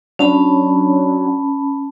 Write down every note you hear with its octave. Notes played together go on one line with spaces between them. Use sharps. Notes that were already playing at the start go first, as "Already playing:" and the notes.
F#3 C#4 D4 A5 B5